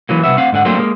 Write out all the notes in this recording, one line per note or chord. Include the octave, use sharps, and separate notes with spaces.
E3 F#3 A#3
C2 C3 B3 E5
C4 F5 F#5
G#2 D3 F#5
F#3 A3 A#3 C4 D4 C5
G#3 A#3